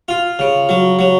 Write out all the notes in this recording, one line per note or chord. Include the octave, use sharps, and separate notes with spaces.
F4
C#3
F#3
F#3